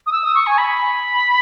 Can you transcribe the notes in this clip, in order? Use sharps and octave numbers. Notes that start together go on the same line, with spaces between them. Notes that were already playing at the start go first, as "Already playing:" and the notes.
D#6
E6
D#6
C#6
G#5
B5